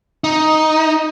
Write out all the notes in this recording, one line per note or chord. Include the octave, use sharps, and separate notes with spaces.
D#4